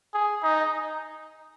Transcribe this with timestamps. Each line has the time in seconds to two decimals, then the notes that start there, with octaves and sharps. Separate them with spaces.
0.14 G#4
0.43 D#4